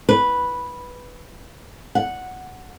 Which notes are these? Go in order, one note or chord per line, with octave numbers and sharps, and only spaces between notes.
B4
F#5